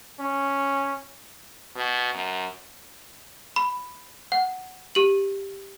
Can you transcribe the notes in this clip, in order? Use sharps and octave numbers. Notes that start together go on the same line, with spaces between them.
C#4
B2
F#2
B5
F#5
G4 F#7